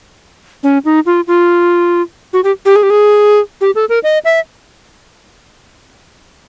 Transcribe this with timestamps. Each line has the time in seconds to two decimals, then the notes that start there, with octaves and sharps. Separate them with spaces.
0.63 C#4
0.85 D#4
1.06 F4
1.27 F4
2.33 F#4
2.44 G4
2.65 G4
2.76 G#4
2.83 G4
2.90 G#4
3.61 G4
3.75 A4
3.89 A#4
4.03 D#5
4.25 E5